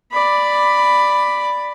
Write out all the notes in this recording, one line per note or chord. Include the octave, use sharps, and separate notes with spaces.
D5 B5